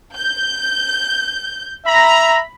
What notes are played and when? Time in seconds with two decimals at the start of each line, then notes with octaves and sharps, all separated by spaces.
0.15 G6
1.86 E5 A#5 B5